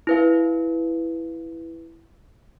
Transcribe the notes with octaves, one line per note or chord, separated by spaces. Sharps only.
E4 B4 F5